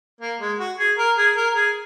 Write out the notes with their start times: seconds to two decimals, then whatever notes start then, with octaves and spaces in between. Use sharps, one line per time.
0.21 A#3
0.40 G#3
0.59 F#4
0.79 G#4
0.98 A#4
1.17 G#4
1.37 A#4
1.55 G#4